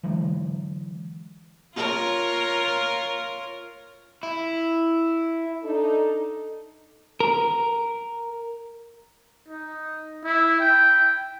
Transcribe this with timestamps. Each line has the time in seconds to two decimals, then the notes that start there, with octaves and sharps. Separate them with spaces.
0.03 D3 E3 F#3 G#3
1.75 F4 A#4 C#5
4.23 E4
5.63 D4 D#4 A4
7.20 A#4
9.48 D#4
10.24 E4
10.60 G5